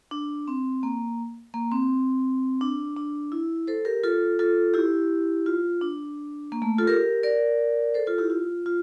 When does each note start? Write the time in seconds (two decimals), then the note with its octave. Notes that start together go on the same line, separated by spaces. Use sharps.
0.11 D4
0.48 C4
0.83 A#3
1.54 A#3
1.71 C4
2.61 D4
2.97 D4
3.32 E4
3.67 A4 C5
3.85 G4 A#4
4.04 F4 A4
4.39 F4 A4
4.74 E4 G4
5.46 F4
5.81 D4
6.52 A#3
6.62 A3
6.78 F4 A4
6.87 G4 A#4
7.23 A#4 D5
7.94 A4 C5
8.07 F4 A4
8.18 E4 G4
8.30 F4
8.66 F4